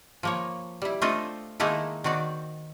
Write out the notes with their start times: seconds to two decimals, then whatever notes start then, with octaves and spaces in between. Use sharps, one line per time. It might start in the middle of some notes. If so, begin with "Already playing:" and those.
0.23 F3 A#3 C#5
0.82 G3 E4
1.02 A3 C4 D4 F4 A4 D#5
1.60 D#3 G#3 A#3 D#4 E4 A4
2.04 D#3 C4 F#4 D5